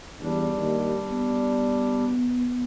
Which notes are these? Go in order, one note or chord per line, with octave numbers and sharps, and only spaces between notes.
E2 G3 D4
D#2
B3